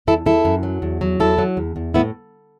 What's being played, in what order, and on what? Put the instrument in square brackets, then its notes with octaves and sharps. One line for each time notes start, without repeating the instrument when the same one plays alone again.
[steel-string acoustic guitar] E2 E4 A4
E2 E4 A4
F#2
F#3
E2
F#3
E2 E4 A4
F#3
E2
E2
A2 B3 E4